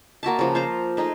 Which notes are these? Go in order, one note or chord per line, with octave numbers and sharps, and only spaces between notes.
A#3 F#4 E5 A5
C#3 F3
F4 C5 A#5
A3 D#4 G#4 D#5